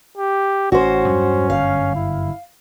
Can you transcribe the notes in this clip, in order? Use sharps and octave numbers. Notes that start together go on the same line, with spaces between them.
G4
A1 C#4 F#4 C5
E2 G2 F#3
G1 F#2 F5
E4